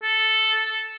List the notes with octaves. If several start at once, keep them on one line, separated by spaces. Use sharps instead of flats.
A4